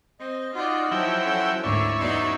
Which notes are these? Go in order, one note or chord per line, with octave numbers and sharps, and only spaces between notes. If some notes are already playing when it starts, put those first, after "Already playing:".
C4 D#5
D#4 F4 F#4 D5
F3 F#3 E4 G5
C#4 A4 F#5
D2 G#2 C#4 E4 A#4 D5
E2 F#3 D#4 D5 C6